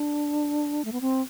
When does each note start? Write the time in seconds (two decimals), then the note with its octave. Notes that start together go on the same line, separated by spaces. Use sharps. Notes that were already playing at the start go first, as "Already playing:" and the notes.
Already playing: D4
0.85 A3
0.92 B3
1.01 C4